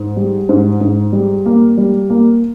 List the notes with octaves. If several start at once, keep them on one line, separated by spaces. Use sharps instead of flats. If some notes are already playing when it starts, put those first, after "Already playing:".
Already playing: G#2
G3
G#2
G#2
G3
A#3
G3
A#3